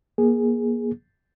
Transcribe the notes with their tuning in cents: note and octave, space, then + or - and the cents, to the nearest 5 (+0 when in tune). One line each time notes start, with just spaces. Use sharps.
A#3 +30 G#4 +0